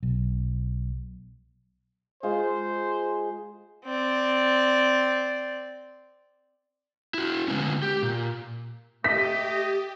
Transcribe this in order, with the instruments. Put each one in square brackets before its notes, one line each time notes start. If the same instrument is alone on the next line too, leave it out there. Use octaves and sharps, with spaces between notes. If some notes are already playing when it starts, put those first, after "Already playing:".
[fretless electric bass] B1
[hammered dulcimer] G#3 F4 [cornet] C5
[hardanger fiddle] C4 D5
[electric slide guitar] E4 F#4
D3 G#3 B3 C#4
G4
A#2
[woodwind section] A3 D#5 [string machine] G4 [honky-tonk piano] B6